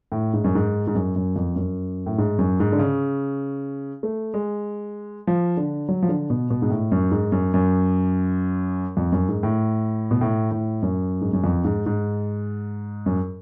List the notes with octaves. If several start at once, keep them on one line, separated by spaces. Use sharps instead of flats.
A2
G#2
F#2
G#2
G#2
F#2
F#2
F2
F#2
A2
G#2
F#2
G#2
D3
C#3
A3
G#3
F3
D3
F#3
F3
D3
B2
B2
G#2
A2
F#2
G#2
F#2
F#2
F2
F#2
G#2
A2
B2
A2
A2
F#2
G#2
F#2
F2
G#2
G#2
F#2